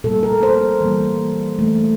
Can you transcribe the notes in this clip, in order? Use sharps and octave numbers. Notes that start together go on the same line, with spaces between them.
A#2 G3 A#3 A4
A#4
C5
E3 G3 A#3
E3 A3